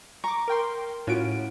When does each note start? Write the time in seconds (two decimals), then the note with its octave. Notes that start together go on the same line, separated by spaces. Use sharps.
0.24 A#5 C#6 D6
0.48 A#4 G5 C6
1.07 A2 C#4 F4 F#4 D7